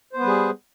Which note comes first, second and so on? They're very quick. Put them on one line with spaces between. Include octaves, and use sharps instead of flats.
C5 B3 B4 G3 G#4